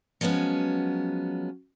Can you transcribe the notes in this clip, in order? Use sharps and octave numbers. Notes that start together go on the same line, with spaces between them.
F3 F#3 G#3 B3 C#4